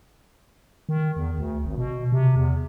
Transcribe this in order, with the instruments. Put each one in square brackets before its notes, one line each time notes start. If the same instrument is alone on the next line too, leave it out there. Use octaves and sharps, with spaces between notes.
[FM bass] D#3
E2
D2
G#1
B2
C3
E2